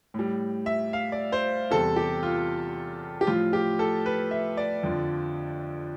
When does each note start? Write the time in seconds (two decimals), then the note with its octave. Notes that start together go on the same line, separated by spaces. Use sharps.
0.14 A2 G3
0.66 E5
0.93 F5
1.12 D5
1.32 C5
1.71 E2 C3 G3 A4
1.96 G4
2.23 F4
3.21 G4
3.27 A2 F3 F4
3.53 G4
3.79 A4
4.06 B4
4.31 E5
4.57 D5
4.83 F2 D3 F3